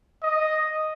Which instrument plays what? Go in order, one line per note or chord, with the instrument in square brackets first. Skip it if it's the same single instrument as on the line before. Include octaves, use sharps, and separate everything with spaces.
[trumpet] D#5